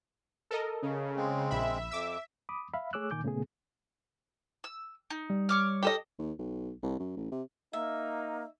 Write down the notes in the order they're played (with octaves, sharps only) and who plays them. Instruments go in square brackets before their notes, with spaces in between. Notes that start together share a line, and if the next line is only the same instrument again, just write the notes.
[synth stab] A4 A#4 D#5
[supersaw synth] C#3
[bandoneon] G#3 C4
[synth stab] A#1 B5 [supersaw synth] E5
[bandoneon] F2 [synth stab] D6 E6
[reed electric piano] B5 D6 D#6
E5 F5 B5
A3 G#4 C#5 D6 E6 F#6
A#2 D#3 G#5 D6 G6
A#2 C#3 A3 B3 G#4
[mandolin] E6
D#4
[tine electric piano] G3
[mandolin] C#5 D6 F6
[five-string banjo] G4 A4 D#5
[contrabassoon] D#2
B1
C2
F#2
A1
C3
[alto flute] A#3 [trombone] D#4 [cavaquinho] E5